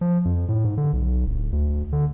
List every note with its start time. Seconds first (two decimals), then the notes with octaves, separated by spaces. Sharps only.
0.01 F3
0.25 F2
0.48 A2
0.65 G#2
0.77 D3
0.93 B1
1.26 D1
1.52 D2
1.93 D3